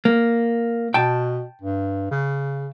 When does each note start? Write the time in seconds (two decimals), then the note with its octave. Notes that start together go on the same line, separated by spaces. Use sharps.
0.05 A#3
0.94 B2 G5 A5
1.61 G2
2.11 C#3